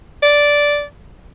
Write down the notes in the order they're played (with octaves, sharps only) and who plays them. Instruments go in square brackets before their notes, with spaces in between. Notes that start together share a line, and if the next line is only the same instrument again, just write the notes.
[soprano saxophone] D5